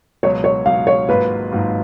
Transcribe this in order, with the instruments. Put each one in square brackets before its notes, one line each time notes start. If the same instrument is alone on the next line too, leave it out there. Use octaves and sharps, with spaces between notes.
[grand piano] C#2 B2 F#3 [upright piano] C#5
[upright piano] C#5
[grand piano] C#2 B2 F#3 [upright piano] F5
[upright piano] C#5
[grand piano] G#1 G#2 F#3 A#3 F4 [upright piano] B4
[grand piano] G#1 G#2 F#3 A#3 F4